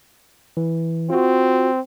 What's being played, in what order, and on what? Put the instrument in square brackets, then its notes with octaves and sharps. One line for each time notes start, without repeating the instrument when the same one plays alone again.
[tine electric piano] E3
[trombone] C4 [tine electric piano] F4 F#4